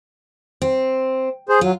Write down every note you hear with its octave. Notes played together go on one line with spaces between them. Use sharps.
C4
G#4 C5
F#3 F4